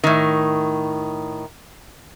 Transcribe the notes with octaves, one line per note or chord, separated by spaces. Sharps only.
A2 D#3